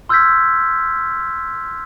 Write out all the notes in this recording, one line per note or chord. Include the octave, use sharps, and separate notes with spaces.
C6 E6 F6 G6 G#6 B6